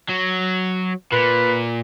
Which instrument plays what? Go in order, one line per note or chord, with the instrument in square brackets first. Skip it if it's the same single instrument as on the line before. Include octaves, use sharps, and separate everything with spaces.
[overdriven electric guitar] F#3
[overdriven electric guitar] A#2 [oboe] B4